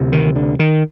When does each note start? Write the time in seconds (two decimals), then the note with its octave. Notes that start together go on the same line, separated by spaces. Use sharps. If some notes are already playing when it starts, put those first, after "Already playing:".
Already playing: D2 C3
0.12 D#3
0.36 D3
0.59 D#3